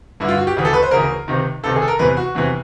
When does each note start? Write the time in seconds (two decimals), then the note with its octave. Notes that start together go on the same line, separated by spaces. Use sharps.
0.20 G2 D3 E4
0.28 F4
0.37 F#4
0.47 G4
0.56 D2 C#3 E3
0.65 A4
0.73 B4
0.83 C5
0.91 D2 C#3 E3 A#4
1.28 C#2 C3 D#3
1.63 C#2 C3 D#3 A4
1.76 G#4
1.82 A4
1.88 A#4
1.99 E2 C3 E3 B4
2.17 F#4
2.35 E2 C3 E3